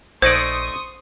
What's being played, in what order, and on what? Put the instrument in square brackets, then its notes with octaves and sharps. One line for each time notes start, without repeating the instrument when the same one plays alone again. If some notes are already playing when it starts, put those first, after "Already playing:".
[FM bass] A#1 [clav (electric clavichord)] A3 D#4 D5 [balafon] C5 [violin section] C6 C#6 D#6